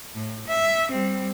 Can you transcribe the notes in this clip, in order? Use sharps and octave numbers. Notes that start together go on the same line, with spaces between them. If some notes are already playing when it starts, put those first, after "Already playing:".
A2
E5
G3 C4